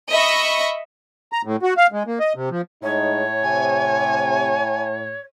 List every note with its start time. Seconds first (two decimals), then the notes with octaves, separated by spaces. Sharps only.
0.11 D#5 E5 B5 C#6
1.32 A#5
1.45 A2
1.63 F#4
1.77 F5
1.92 G#3
2.07 A#3
2.20 D#5
2.35 C3
2.50 F3
2.83 A2 G#3 D#4 C#5
3.43 C3 G#5